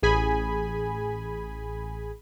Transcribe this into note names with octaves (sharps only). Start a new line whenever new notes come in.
A1 G#4 G#5 B5